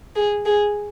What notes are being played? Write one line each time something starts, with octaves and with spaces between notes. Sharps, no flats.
G#4
G#4